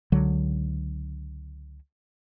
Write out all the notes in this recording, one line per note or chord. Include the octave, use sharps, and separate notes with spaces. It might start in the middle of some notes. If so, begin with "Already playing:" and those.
C#2 D3 F#3